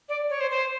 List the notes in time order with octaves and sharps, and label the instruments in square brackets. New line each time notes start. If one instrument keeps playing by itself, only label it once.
[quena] D5
C#5
C5
C5